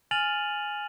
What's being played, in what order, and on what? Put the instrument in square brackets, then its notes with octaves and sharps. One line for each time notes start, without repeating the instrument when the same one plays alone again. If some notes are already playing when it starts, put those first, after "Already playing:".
[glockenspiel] G#5 F6 A6 D#7 F7 F#7